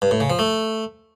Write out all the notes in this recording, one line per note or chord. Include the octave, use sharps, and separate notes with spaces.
G2
A2
C#3
F3
A3